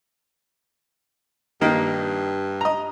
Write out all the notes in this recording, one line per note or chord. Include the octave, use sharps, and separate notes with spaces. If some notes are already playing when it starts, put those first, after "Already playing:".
G2 D#3 A#3
D#5 A#5